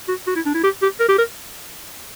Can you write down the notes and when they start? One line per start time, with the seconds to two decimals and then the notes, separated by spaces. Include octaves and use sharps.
0.08 F#4
0.27 F#4
0.36 E4
0.46 D4
0.54 E4
0.64 G4
0.82 G4
1.00 A#4
1.08 G4
1.18 A#4